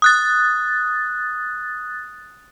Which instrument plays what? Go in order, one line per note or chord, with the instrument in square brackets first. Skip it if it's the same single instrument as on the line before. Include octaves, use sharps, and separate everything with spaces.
[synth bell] D#6 F#6 A6